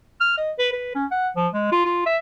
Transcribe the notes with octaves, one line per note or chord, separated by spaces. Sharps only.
F6
D#5
B4
B4
C#4
F#5
F3
G#3
F4
F4
E5